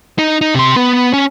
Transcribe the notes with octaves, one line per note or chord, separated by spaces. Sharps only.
D#4
D#4
C3 C6
B3
C#4